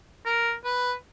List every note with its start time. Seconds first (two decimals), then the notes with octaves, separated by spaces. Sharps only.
0.26 A#4
0.64 B4